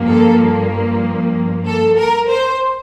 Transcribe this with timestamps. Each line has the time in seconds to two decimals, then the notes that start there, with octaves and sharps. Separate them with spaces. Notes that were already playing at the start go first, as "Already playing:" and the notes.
Already playing: G2 F3 A#3
0.10 A4
1.67 A4
1.98 A#4
2.30 C5